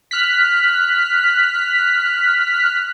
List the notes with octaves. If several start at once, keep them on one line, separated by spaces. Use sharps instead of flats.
F6 F#6 B6